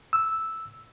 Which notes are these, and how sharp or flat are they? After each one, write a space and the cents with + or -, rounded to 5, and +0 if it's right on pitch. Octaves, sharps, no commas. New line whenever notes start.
E6 -5